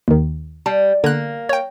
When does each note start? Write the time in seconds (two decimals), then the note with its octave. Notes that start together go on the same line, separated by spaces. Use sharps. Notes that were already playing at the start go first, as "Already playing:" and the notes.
0.08 D#2 D#3
0.66 G3 A5
1.04 D3 A#3 F#6
1.49 C#5 G5